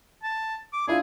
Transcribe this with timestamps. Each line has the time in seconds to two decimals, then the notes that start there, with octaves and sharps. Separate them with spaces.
0.23 A5
0.73 D6
0.88 D4 E4 F4 G#4